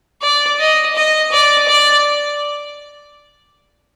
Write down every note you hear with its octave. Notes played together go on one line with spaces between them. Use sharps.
D5
D#5
D#5
D5
D5